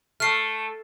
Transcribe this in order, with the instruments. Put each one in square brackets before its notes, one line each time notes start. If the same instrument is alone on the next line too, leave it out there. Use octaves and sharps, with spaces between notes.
[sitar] A3 [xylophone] F6 C7